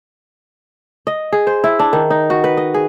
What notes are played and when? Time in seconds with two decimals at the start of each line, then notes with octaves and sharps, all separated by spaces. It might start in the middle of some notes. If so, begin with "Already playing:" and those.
1.07 D#5
1.33 G#4
1.47 C5
1.64 E4
1.79 D4
1.93 D#3
2.10 D#4
2.30 F#4
2.44 B4
2.57 D#5
2.74 G#4